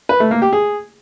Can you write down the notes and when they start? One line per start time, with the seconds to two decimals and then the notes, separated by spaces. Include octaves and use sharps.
0.09 B4
0.20 A3
0.31 A#3
0.42 G4
0.53 G#4